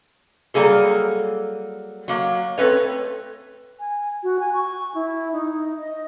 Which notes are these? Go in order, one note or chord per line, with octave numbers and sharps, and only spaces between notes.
F#3 G3 A#3 G#4 A4
F#3 A#3
A3 C4 B4 C#5
G#5
F#4
G#5
C#6
E4
D#4
D#5